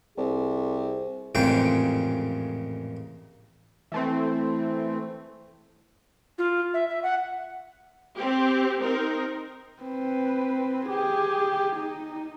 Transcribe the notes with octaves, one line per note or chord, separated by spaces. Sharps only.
C2 G#4
A1 F2 A#2 C#3 G#3 G5
E3 A3 C4
F4
E5
E5
F#5
C4 G4
C4 D#4 A#4
C4 B4
G4 G#4
D#4